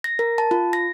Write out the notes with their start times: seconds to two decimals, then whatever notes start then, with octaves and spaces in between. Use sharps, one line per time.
0.04 A#6
0.19 A#4
0.38 A5
0.51 F4
0.73 A#6